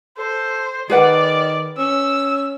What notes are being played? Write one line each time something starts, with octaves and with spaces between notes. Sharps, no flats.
A4 C5
D#3 G#4 B4 D5 F#5
C#4 E6